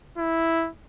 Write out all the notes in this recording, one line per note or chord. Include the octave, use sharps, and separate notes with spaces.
E4